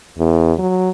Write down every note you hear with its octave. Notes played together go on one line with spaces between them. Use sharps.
E2
F#3